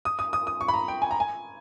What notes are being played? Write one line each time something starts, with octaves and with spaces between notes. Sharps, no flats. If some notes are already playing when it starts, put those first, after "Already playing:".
D#6
D#6
D#6
D#6
C#6
B5
A#5
G5
G#5
A#5
G#5